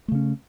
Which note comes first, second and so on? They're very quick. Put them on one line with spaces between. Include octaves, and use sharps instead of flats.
A3 C#3 C#4